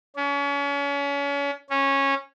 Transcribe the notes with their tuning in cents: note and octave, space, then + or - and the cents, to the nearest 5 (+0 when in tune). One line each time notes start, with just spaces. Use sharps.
C#4 +35
C#4 -15